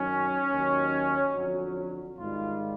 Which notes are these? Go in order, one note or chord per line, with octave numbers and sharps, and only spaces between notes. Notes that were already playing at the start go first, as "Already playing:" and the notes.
Already playing: F#2 D#3 F#3 C#4
D#2 D#3 F#3
F2 D3 F#3 F#4
G#2 D#3 G3 F4